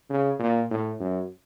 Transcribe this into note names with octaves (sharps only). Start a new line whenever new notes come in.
C#3
A#2
A2
F#2